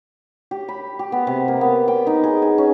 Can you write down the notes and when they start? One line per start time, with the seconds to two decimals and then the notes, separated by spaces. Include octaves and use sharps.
0.51 G4
0.68 B5
0.99 G4
1.12 B3
1.27 C3
1.48 A#3
1.61 B3
1.88 G5
2.07 D#4
2.23 G#4
2.42 G#5
2.58 C#4